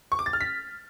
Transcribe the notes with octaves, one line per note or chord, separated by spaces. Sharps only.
C#6
D6
A6
F6
B6